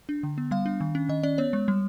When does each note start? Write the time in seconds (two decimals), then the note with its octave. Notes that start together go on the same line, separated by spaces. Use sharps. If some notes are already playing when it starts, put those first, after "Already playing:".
0.09 D4
0.23 D3
0.38 B3
0.51 G3 F5
0.66 D4
0.80 D#3
0.95 C#4
1.09 D#3 D#5
1.23 C#4 D5
1.38 B3 C#5
1.53 G#3
1.68 G3